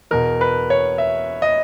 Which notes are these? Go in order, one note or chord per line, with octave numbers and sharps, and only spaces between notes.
E2 B2 A#4
B4
C#5
E5
D#5